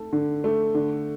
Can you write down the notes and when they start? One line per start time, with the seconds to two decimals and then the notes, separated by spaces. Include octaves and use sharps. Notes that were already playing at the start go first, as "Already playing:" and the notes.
Already playing: A3 A4
0.13 D3
0.44 A3
0.75 D3